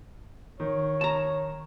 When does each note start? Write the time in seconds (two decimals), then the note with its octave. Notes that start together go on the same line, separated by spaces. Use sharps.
0.60 D#3 C#5
1.01 A5 A#5